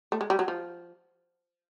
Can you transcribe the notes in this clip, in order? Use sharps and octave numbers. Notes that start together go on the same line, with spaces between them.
A3
G#3
G3
F#3
F3